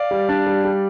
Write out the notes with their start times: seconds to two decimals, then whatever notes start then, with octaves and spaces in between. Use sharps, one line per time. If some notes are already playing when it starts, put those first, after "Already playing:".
Already playing: D5 F5
0.11 G3
0.29 D4
0.46 G3
0.64 G3